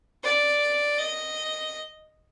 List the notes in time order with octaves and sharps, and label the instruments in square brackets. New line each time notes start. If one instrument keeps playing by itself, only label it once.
[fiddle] D5
D#5